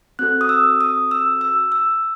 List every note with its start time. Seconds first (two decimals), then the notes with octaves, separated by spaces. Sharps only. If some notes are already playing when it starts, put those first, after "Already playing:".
0.19 C4 F#4 A4 F#6
0.41 D#6
0.49 E6
0.81 D#6
1.11 E6
1.41 E6
1.72 E6